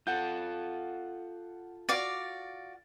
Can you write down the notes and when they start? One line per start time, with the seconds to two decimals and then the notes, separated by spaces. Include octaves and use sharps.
0.07 F4 A4 F#5 G6
1.89 F#4 D5 F5 A6 D7